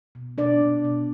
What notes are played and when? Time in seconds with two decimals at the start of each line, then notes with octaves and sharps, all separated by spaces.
0.15 B2
0.38 B2 D4 D5
0.61 B2
0.84 B2